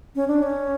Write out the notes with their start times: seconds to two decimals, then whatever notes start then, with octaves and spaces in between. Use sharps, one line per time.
0.16 C#4
0.28 D4
0.43 C#4